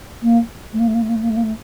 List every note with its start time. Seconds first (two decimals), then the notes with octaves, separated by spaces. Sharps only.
0.22 A#3
0.73 A3
0.79 A#3
0.87 A3
0.94 A#3
1.02 A3
1.09 A#3
1.15 A3
1.23 A#3
1.30 A3
1.36 A#3
1.43 A3